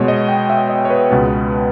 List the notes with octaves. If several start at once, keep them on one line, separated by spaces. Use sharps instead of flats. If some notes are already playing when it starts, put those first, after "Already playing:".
Already playing: B2 G#3 B3 C#5
D#5
G5
E5
D#5
C#5
B4
C#2 B2 G#3 B3